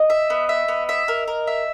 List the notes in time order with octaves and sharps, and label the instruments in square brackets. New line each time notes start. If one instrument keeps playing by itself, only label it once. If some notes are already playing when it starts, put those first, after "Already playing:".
Already playing: [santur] D#5
[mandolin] E5
B3
E5
B3
E5
A#4
A#4
E5